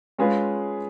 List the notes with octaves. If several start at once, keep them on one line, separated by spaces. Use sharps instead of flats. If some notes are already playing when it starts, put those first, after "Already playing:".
G#3 C#4 F4 G#4 B4